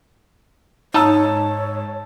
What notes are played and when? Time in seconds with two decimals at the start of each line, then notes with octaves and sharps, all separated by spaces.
0.94 G#2 D#4 C#5 A5 E6